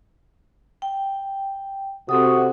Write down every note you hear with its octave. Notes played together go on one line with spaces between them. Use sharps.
G5
C3 C4 F#4 A4 D#6